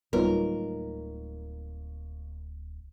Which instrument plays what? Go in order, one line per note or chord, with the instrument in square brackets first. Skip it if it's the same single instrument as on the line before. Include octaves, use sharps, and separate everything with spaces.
[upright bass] D1 [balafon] G3 F4 B4 [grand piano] A#3 D#4 C#5 [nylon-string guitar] A#4